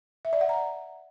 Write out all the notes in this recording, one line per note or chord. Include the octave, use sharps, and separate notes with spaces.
E5
D5
F#5
A#5